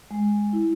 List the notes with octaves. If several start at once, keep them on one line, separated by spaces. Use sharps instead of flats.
G#3
E4